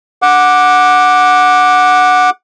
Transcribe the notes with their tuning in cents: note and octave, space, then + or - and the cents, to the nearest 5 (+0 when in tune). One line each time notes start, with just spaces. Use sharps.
F#5 -10 D6 +0